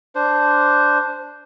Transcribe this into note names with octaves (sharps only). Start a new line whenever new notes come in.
D4 C5